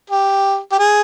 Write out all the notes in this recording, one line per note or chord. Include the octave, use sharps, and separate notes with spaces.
G4
G4
G#4